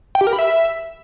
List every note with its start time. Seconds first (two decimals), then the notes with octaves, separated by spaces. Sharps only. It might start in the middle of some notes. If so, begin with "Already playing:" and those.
0.15 G5
0.21 G4
0.27 A#4
0.33 B5
0.39 E5